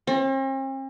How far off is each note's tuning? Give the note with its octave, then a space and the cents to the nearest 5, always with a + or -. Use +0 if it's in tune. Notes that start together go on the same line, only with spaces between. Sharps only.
C4 +45